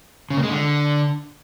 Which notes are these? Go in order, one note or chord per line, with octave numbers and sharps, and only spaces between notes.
C#3
A#3
G#3
D3